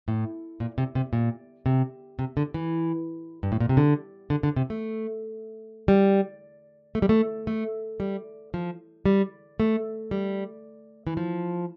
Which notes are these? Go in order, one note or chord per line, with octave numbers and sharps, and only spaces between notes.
A2
A#2
C3
C3
A#2
C3
C3
D3
E3
G2
A2
A#2
C3
D3
D3
D3
C3
A3
G3
A3
G3
A3
A3
G3
F3
G3
A3
G3
E3
F3